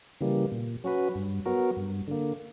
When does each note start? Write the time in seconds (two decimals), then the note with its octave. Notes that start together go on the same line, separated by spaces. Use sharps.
0.21 C#3 E3 G3 A#3
0.52 A#2
0.84 F#3 C#4 F#4 B4
1.15 G2
1.45 F#3 B3 F#4 A#4
1.77 G2
2.08 D3 A#3